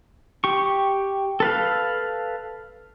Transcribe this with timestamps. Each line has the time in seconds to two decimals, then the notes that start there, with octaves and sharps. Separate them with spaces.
0.44 G4 C#6
1.40 A4 B4 F5